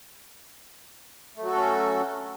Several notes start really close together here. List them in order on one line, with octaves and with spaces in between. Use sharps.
A3 F#3 F#4 A4 C#4